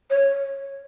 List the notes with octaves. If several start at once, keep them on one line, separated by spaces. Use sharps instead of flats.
C#5